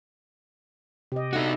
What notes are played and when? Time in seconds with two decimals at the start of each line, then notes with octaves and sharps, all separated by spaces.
1.12 C3 G4 D#5
1.33 D4 D#4 F#4 A4 E5